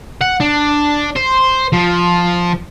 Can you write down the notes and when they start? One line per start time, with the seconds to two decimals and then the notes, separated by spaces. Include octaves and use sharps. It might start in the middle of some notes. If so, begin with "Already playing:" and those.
0.21 F#5
0.40 D4
1.16 C5
1.73 F3